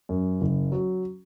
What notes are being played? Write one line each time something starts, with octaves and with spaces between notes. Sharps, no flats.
F#2
F#1
F#3